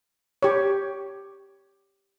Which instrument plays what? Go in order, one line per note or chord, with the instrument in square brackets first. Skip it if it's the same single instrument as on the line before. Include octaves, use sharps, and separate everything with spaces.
[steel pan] G4 C#5